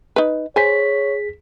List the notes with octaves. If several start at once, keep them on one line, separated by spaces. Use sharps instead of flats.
D#4 B4
G#4 C5 C#5 G#5 B6